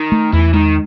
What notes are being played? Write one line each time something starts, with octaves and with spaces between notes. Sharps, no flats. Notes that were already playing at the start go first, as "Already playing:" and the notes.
Already playing: D#3
A3
E2 E3
D#3 G#3